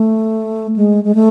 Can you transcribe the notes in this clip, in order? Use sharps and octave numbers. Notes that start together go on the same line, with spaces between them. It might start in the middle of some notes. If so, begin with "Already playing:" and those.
Already playing: A3
G#3
G#3
A3